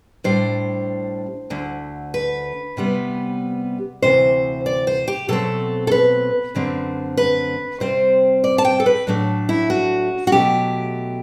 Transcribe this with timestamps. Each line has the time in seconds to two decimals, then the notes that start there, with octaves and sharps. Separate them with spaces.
0.24 A2 G3 D4 C5
1.50 D2 D3 A3
2.14 B4
2.77 C3 G3 B3
4.02 D2 C3 E3 C5
4.66 D5
4.87 C5
5.08 G4
5.28 B2 F#3 A3 C4 A4
5.87 A4
5.91 B4
6.55 F#2 D3 A3 C4
7.17 B4
7.80 C3 G3 C4 C5
8.44 D5
8.58 A5
8.65 G5
8.80 A4
8.86 B4
9.07 A2 F#3 A3 D4
9.49 E4
9.70 F#4
10.27 F#4
10.32 B2 F#3 A3 G4